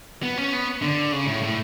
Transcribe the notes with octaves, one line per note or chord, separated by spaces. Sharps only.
B3
C#4
B3
D3
C#3
A2
A2